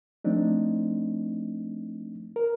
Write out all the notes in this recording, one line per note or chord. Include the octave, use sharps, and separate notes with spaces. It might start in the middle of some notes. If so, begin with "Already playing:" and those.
F3 A3 C4 D4 D#4
A#4